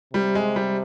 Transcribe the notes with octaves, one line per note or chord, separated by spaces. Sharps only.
C3 G3
G#3
G3